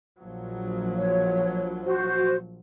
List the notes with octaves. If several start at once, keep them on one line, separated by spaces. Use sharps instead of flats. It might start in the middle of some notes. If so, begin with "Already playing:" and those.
A#1 F3 F#3
C#5
F#4 C5